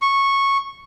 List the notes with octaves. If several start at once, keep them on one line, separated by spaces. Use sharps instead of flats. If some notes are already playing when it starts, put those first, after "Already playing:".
C#6